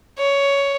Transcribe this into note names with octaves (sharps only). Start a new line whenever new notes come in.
C#5